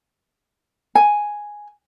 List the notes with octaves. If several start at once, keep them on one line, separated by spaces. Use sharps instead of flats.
G#5